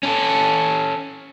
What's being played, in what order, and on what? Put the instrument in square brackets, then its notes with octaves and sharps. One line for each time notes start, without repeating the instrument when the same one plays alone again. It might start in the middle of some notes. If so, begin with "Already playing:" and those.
[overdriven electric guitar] C#4 A4